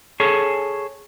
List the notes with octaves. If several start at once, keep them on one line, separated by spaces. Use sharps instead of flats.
G#4 A4 C#5